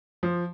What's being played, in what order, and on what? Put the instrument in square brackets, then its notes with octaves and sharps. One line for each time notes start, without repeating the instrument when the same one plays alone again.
[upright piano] F3